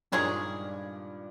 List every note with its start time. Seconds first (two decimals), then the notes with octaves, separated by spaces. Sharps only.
0.12 G2 A#2 D#3 G#3 C#4 G#4